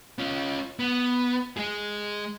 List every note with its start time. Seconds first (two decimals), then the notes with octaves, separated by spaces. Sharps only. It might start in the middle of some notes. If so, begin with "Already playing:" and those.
0.19 C#4 F4
0.79 B3
1.57 G#3 G#4